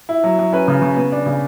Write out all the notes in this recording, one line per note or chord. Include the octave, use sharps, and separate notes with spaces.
E4
F#3
F#3
C#4 B4
C#3
C#3
B3
D4
C#3